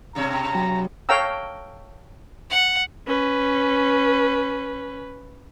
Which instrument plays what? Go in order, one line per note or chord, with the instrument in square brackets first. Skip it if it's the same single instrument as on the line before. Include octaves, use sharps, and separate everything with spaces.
[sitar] G2 B2 C#5 [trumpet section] A#5
[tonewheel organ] F#3
[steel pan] A4 C#5 F5 G5 A#5 E6
[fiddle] F#5
[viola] C#4 B4